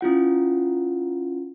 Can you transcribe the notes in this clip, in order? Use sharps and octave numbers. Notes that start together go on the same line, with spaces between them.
C#4 E4 F4 F#5